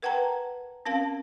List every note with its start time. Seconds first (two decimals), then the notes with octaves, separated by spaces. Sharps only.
0.02 A#4 B4 F#5 G5 A5 A#5
0.86 C4 C#4 A#4 F5 A5